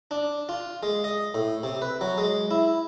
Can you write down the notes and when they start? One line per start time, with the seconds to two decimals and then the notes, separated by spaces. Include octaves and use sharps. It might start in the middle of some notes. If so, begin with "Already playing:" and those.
0.11 D4
0.49 F4
0.83 G#3
1.04 D#5
1.34 A2
1.63 C3
1.82 B4
2.01 F#3
2.18 G#3
2.51 E4